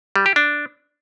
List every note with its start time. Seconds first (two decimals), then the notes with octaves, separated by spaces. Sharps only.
0.16 G3
0.26 G4
0.36 D4